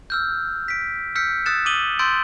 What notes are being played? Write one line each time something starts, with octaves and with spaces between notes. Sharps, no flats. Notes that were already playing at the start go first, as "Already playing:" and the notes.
E6 F6 G6
B6 D7
E6 F6 G6 B6 C#7
D#6 E6 F#6 A6 C#7 E7
D6 D#6 D#7 F#7 G7
C6 E6 G6 A6 D7